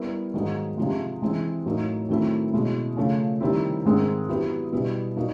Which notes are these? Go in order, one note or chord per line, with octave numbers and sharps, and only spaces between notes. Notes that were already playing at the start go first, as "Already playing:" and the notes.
Already playing: G3 B3 E4 G4 A#4
G#2 D#3 F#3 A#3 D#4
C3 F3 G#3
E3 G#3 C4
A2 F#3 A#3 D#4
D#3 F#3 A3 C4 E4
B2 G#3 C#4 E4
C#3 F3 A3
C3 D#3 G3 C4 E4
G#2 D#3 G#3 C4
F#3 B3 E4 G4
B2 G3 B3 E4
A#2 F#3 A#3 D#4 F#4